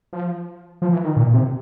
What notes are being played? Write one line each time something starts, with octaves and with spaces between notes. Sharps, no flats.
F3
F3
E3
D#3
A#2
C3